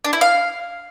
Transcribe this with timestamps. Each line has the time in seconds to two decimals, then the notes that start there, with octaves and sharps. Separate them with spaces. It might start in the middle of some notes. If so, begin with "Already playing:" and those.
0.04 D4
0.13 E4
0.21 F5